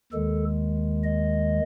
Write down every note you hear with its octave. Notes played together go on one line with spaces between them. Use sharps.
D#2 D#3 G#3 A4
D#5